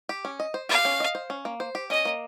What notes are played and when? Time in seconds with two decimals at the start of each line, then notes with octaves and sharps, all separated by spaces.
0.09 G4
0.25 C#4
0.40 D#5
0.54 C5
0.69 G4 F5
0.85 C#4
1.00 D#5
1.15 C5
1.30 C#4
1.45 A#3
1.60 C5
1.75 G4
1.90 C#4 D#5
2.05 A#3